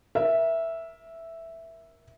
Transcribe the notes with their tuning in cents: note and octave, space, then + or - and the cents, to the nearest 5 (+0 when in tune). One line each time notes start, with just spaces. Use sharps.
A#4 +20 E5 +0